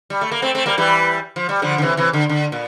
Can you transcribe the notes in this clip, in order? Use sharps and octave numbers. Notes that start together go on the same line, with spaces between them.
G3
A3
A#3
A3 C4
A3 C4
G3 A#3
E3 G3
F3
G3
D3 F3
D3
C3 E3
C3 E3
D3
D3
A#2